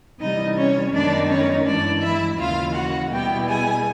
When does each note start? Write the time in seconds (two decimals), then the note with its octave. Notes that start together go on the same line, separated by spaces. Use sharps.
0.21 C3 E3 G3 D#4 D#5
0.57 C#4 C#5
0.93 F#2 D#3 G#3 B3 D4 D#4 D5
1.29 C#4 C#5
1.65 G2 E3 G#3 D4 D5
2.02 E4 E5
2.38 D#2 C#3 E3 F4 F5
2.75 F#4 F#5
3.11 B2 G3 B3 E4 G4 G5
3.47 G#4 G#5